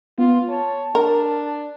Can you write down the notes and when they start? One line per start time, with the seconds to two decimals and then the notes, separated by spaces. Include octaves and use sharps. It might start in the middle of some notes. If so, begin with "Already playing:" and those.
0.18 B3 F4
0.49 C#5 A5
0.95 D4 A#4